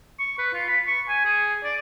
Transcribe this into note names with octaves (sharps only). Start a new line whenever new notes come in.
C#6
B4
F4
B5
C#6
G#5
G#4
D5